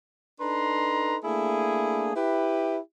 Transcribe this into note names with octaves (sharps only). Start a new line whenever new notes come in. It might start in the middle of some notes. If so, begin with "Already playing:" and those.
D4 D#4 A4 B4 A#5 C6
A3 A#3 D4 E4 G#4
E4 G4 B4